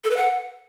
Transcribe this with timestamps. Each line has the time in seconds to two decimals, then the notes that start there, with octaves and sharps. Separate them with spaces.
0.04 A4
0.10 B4
0.17 F#5